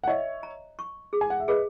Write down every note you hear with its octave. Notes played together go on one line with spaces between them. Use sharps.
F#5
C#5 D#5 E5
A#5
C#6
G#4
G#5
F#5
E5
G#4 B4 D#5